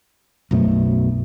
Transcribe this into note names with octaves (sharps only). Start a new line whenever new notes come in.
B1 F#2 B2 A3